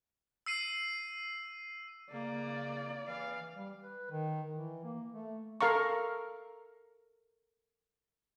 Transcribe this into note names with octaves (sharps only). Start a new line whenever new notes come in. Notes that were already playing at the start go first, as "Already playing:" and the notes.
E6 C7 D#7
C#3 A#3 D5
E3 F5
G3
B4
D#3
E3
A#3
A3
A4 A#4 F5 A#5 C#6